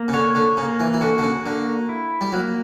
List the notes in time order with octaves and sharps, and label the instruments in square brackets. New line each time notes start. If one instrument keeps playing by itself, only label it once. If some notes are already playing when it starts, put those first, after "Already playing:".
Already playing: [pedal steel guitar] A#3
[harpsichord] C#3
[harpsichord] D3 [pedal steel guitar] C#5
[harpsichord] D3
[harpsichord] C#3 [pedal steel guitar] A#3
[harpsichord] E3
E3
[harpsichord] D3 [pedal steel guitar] F#4
[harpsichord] D3
C#3
[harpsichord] D3 [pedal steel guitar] A#3
[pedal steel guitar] E4
[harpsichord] G3
[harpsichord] F#3 [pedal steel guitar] A#3